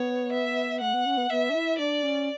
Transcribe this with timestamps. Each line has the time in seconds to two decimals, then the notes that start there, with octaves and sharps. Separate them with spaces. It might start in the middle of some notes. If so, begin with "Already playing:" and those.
Already playing: B3 C#5
0.32 E5
0.81 A3 F#5
0.94 B3
1.06 C#4
1.17 B3
1.30 B3 E5
1.50 D4
1.55 E4
1.79 D4 D5
2.03 C#4